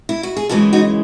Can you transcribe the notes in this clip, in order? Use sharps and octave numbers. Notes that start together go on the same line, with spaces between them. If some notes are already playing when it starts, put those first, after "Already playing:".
E4
F#4
G#4
F#2 C#3 E3 G#3 F#4 A4
D#4 F#4